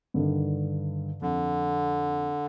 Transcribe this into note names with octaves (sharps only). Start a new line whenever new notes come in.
G2 D3 D#3
F2 D3